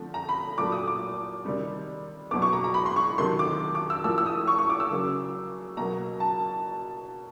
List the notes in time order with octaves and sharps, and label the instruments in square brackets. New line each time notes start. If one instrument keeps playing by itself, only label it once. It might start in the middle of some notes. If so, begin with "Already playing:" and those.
Already playing: [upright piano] D3 F3 A3 C4
A#5
B5
A#2 F#3 A3 D6
D#6
D6
C3 D#3 G3 C4
B2 F#3 B3 D6
C#6
A#5
A#5
B5
C6
C#6
C3 D#3 F#3 A3 C6
D6
D6
E6
A2 F3 A#3 E6
E6
D#6
C#6
C#6
D6
E6
C#3 F#3 A#3
B2 F#3 A#3 A#5
A5